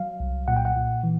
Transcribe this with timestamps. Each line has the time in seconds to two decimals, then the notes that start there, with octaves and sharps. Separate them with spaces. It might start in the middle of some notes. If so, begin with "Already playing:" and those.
Already playing: F#3 F5
0.20 C2
0.48 A#2 F#5
0.57 G5
0.65 F#5
0.76 A#2
1.04 E3